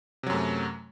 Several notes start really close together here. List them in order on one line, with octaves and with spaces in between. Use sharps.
C3 F#3 F#2 A3